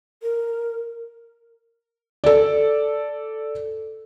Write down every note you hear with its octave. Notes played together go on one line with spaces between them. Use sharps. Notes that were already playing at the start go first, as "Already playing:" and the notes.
A#4
A4 D5